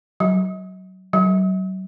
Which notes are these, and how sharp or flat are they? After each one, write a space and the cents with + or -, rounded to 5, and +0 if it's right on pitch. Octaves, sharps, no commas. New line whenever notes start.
F#3 +20
F#3 +35